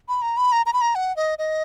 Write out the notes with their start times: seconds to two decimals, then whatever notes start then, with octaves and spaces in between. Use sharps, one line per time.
0.09 B5
0.22 A#5
0.37 B5
0.52 A#5
0.66 A#5
0.73 B5
0.81 A#5
0.95 F#5
1.17 D#5
1.39 D#5